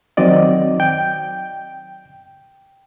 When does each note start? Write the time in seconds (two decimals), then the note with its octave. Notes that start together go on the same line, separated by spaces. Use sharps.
0.17 D#3 F#3 C4 D5 D#5
0.80 G5